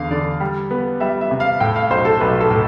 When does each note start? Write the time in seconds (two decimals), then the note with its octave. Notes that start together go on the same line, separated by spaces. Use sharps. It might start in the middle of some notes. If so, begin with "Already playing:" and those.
Already playing: E2 D3 F5
0.11 D3 D5
0.40 G3
0.71 B3
1.00 G3 E5
1.21 E5
1.31 C3
1.40 F5
1.60 A2 G5
1.76 F5
1.90 B1 C5
2.05 A4
2.20 B1 B4
2.41 A4
2.50 A2